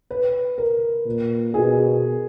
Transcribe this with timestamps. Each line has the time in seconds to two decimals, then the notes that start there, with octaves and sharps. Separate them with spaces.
0.10 B4
0.58 A#4
1.06 A#2
1.54 B2 G#4